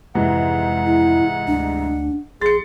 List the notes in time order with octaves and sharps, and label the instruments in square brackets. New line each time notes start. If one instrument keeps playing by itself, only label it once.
[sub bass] F2 [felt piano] G#2 C3 E3 [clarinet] F#5
[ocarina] E4
[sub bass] D2 [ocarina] D4
[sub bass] A#1 [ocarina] G#4 [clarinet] C6 [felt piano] A6 C#7